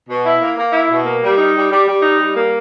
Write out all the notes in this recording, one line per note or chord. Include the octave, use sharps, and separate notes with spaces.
B2
E4
A#3
A#3
E4
B2
A#3
G3
D#4
G3
G3
G3
D#4
G3
A#3